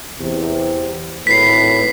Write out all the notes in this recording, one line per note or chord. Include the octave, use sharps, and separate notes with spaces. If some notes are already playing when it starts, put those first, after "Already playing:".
E2 C3
G#1 A2 B4 B6 C7